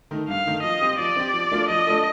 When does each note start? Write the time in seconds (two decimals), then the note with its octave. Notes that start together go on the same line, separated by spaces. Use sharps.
0.11 D#3 A3 D#4
0.28 G2 F5
0.46 D#3 A3 D#4
0.63 F3 D#5
0.81 C4 G4
0.99 F3 D5
1.16 C4 G4
1.34 F3
1.51 A3 D4 F4 A4
1.69 F3 D#5
1.87 A3 D4 F4 A4